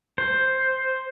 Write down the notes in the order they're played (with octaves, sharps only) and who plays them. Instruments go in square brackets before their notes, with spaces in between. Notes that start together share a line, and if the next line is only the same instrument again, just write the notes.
[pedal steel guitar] C5